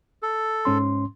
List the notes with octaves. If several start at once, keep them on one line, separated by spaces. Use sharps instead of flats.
A4
G#2 C#4 C6